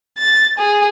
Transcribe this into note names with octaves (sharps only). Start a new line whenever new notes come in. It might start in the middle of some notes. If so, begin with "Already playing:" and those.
A6
G#4